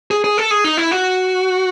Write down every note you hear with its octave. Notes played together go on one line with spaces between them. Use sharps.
G#4
G#4
A4
G#4
D#4
E4
F#4